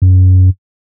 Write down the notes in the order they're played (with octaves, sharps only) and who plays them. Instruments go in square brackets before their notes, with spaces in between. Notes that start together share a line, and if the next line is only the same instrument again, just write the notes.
[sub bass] F#2